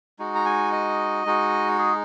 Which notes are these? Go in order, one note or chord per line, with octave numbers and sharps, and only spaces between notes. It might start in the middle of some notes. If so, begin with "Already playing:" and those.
G#3 D#4 F#4
A#5
G#5
D#5
G#3 D#4 F#4
G#4